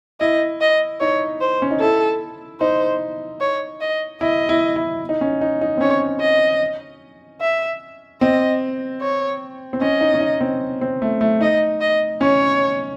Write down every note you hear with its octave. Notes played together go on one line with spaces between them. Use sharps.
E4 D#5
D#5
D#4 C#5
C5
C#4
D#4
E4 A4
D#4 C5
C#5
D#5
E4 D#5
E4
E4
D#4
C#4
D#4
D#4
C4
C#4 C#5
D#5
E5
C4 D#5
C#5
C4
C#4 D#5
D#4
C#4
D#4
C4
C4
A3
A3
D#4 D#5
D#5
C#4 C#5